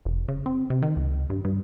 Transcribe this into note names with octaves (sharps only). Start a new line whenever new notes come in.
F1
C#3
C4
C3
D#3
C#2
G2
G2